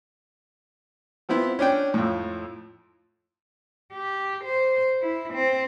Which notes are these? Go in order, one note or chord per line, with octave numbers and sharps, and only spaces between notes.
F3 B3 C4 E4
C#4 D4 G5
F2 A2
G4
C5
E4
C4